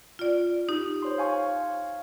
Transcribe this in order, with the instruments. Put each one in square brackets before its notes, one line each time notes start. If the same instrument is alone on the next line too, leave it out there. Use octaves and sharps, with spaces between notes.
[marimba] F4 D5
D#4 G4
[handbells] C5 C#5 C6
F5 G#5 C#6